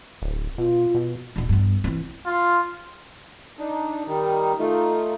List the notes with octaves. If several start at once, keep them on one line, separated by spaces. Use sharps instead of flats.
D1
B2 F4
B2
D#1 D4
G2 B3
E3 C4
F4
D4 D#4
D#3 G3 D#4
A3 D#4 F4